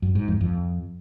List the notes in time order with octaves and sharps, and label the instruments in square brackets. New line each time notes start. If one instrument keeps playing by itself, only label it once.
[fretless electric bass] F#2
G#2
F2
F2